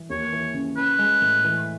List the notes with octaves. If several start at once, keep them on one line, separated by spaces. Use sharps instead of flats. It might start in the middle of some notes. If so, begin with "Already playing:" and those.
Already playing: E3
D#2 C#5
E3
C#3
C#4 B4
G#3
A2
E3